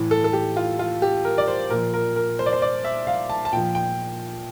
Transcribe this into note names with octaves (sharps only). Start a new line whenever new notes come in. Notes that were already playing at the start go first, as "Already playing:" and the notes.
Already playing: A2 E3
A4
A4
G4
F4
F4
G4
A#4
D5
C5
A#2 F3 A#4
A#4
A#4
C5
D5
C5
D5
E5
F5
A5
A5
A#2 F3 G5
G5